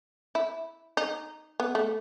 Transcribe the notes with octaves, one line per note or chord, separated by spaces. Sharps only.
E4
D#4
B3
A3